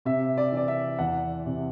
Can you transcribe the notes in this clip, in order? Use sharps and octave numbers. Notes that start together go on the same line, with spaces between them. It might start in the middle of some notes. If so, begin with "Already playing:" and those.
C3 E5
D5
E3 D5
E5
E2 F#5
C3